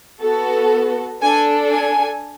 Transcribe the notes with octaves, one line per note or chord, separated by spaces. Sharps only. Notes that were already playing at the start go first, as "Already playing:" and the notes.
B3 F#4 A4
D4 A4 G#5
G#5